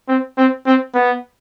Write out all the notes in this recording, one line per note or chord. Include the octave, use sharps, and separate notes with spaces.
C4
C4
C4
B3